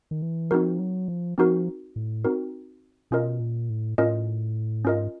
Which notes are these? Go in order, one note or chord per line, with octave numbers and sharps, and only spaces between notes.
D#3
E3
F3 C4 D#4 F#4 A#4
F#3
F3
F3 C4 D#4 F#4 A#4
A2
C4 D#4 F#4 A#4
B2 C#4 F4 A#4 D#5
A#2
A2
A2 C#4 F4 A#4 D#5
G#2 C#4 F4 A#4 D#5